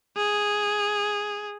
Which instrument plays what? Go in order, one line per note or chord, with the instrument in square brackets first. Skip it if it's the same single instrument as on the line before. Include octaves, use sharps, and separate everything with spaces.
[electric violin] G#4